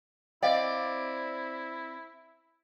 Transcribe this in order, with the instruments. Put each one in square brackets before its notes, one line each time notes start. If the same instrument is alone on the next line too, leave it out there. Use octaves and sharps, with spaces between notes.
[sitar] C4 D5 [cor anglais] E4 [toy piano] D#5 F5 G5